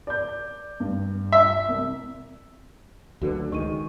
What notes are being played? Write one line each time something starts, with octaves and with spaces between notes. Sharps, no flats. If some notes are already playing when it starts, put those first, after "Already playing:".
D5 G6
G2
E5
C2
D2 D3 F#3 F#4 B4
C#2 D#3 G#3 C#6 D#7